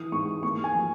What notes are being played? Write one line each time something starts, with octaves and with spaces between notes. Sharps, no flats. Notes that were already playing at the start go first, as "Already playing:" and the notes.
Already playing: E3 D#6
G#2 C#6
A#3 C#6
G#5
F3